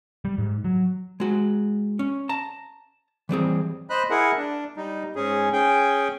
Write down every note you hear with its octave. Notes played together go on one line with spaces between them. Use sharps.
G3
G#2
F#3
G#3 F#4
C#4
A5 A#5
E3 G3 C4 G#4
C5 D#5 B5 F#6
E4 G#4 A#4 F#5
D4
G3 D#4
G#2 C#4 G#4
C#4 G#4 G5